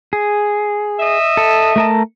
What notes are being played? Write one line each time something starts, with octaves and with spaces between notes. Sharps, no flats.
G#4
D#5 E5
A4
A3 A#4 A5